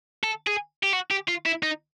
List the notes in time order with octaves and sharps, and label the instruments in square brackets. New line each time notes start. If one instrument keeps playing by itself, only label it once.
[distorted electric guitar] A4
G#4
G4
F#4
G4
F4
E4
D#4